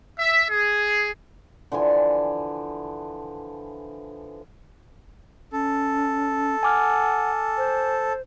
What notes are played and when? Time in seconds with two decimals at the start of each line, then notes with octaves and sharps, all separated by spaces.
0.18 E5
0.49 G#4
1.72 D3 E3 F3 G#5
5.52 C#4 A4
6.63 F#5 G#5 D6 F6
7.58 C5